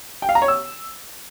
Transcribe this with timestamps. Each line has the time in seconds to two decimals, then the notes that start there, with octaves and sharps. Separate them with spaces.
0.22 G5
0.29 F5
0.35 A#5
0.42 C#5
0.48 E6